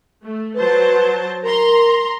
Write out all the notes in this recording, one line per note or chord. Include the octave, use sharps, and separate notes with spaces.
A3
F#3 B4 C5 A5
A#4 A#5 C6